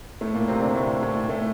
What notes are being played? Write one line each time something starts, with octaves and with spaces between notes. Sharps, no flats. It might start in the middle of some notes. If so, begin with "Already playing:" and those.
A2 A3
A#2 A#3
C3 C4
D3 D4
A2 A3
A2 A3
A2 A3